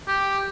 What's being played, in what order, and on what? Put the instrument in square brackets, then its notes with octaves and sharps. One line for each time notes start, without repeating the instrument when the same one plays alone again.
[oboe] G4